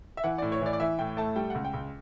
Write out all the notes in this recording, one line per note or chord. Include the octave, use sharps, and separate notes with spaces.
E5
E3 F#5
A2 D5
C#5
E3 D5
D5
E3 E5
A2 G5
A3 A5
G3 G5
C#2 F#5
G5
C#2